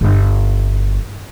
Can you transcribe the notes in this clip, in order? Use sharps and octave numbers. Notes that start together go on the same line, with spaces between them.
G1